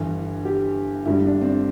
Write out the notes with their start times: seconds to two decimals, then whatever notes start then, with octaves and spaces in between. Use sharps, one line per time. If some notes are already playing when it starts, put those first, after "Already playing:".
Already playing: G1 G2 E3
0.45 G4
1.06 G1 G2 G3 E4
1.26 D4
1.42 C4
1.46 D4